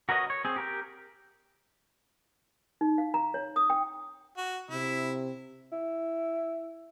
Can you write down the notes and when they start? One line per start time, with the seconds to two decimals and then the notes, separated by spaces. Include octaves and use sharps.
0.09 F#4 A#4 B4 C#5 D#5
0.30 C#5
0.45 C4 G#4
0.56 G4 A#4 G5
2.81 D#4
2.98 F5
3.14 A#5
3.34 C#5
3.56 D#6
3.70 G5
4.37 F#4
4.70 C3 E4
5.72 E4